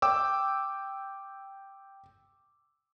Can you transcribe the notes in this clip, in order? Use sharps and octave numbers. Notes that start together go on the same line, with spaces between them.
G5 D6 E6